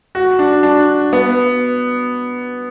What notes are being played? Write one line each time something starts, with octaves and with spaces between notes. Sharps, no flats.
F#4
D4
D4
B3